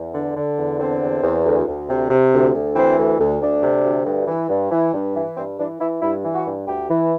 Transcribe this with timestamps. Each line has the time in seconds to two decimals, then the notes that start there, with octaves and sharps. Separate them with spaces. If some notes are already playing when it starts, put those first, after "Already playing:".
Already playing: E2
0.15 D3
0.37 D3
0.59 E2
0.80 D3 C4
1.02 E2
1.23 E2
1.45 D2
1.68 D2
1.90 C3
2.11 C3
2.33 D2
2.54 D2
2.76 E3 C4
2.98 D2
3.19 D2
3.42 D2 D4
3.63 C3
3.85 D2
4.06 G2
4.28 E3
4.50 G2
4.72 E3
4.94 G2
5.16 E3
5.37 G2 C4
5.59 E3 D4
5.80 E3 E4
6.02 G2 E4
6.25 E3
6.35 F#4
6.46 G2
6.68 D2 G4
6.90 E3